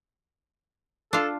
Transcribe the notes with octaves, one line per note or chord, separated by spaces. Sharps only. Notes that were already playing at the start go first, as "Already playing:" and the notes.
D4 F4 A4